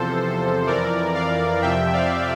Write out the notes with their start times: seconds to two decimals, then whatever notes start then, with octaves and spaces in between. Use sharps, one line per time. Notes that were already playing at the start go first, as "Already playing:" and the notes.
Already playing: E2 C3 F3 A4 C5
0.67 F2 E3 A#4 D5
1.15 D5 F5
1.61 F2 C3 F3 E5 G5
1.93 D5 F5